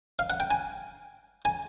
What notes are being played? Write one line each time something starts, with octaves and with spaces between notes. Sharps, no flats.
F5
F#5
G5
G#5
G#5